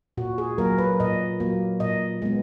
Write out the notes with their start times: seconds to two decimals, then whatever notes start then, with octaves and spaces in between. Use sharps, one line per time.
0.17 A#2 F#4
0.38 G#4
0.58 F#3 A#3 A#4
0.78 B4
1.00 A#2 D#5
1.40 F#3 A#3
1.80 A#2 D#5
2.22 G#3 B3